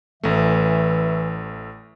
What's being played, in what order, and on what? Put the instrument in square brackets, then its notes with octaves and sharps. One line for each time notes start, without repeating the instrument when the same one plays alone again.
[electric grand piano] A1 A3 [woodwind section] E3 E5